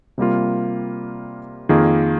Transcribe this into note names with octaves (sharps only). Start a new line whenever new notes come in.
C3 G3 A#3 F4
F2 D#3 A#3 F4 G#4